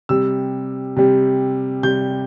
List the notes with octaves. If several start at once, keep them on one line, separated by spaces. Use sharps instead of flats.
C3 G3 E6
C3 G3
C3 G3 G6